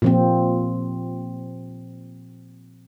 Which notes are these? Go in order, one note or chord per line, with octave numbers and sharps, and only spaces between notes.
A#2 F3 C4